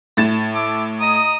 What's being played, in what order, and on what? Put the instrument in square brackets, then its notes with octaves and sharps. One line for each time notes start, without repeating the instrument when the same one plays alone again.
[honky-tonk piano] A2 A6 E7
[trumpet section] E5 A5 D6
D#5 A#5 D#6